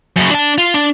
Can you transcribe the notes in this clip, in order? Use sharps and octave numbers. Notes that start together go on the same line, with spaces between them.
F#2 C#3
D4 A5
F4
D4